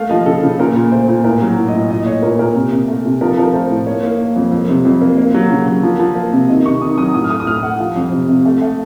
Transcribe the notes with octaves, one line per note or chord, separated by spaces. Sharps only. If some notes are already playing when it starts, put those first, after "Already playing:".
Already playing: A3 A#3 F5
F3 D#5
C#3 A4
C#3
A#2 A#4
A#2
A3 C5
A#2
A2 A#4
F#3
A2
D#5
A2
A#2 D#5
D#5
A3 C#5
A#2 A#4
A#2 A#4
C3
C3
A3
C3
F3 A#4
A4
F3 A#4
A3 C5
A2
A#3 C#5
A#3
A#3
F2
F2
C3
F2
A#3
A#3
F#3
C#3
F#3
F3
F3
A#3
C3
D#3 D#5
C3 C#6
D#3 D#6
F#3 D#6
A2 D#6
F6
A3 D#6
D#6
A2 F6
A3 F#5
F3 F5
F2
C3
C3
A3
A3